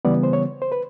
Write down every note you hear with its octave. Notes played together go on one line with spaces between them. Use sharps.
C#3 E3 G3 B3 D5
C5
C#5
C5
B4